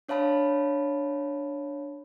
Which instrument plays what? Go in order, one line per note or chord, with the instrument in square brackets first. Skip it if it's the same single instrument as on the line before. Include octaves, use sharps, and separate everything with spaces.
[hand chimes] D4 C#5 F5 A5 B5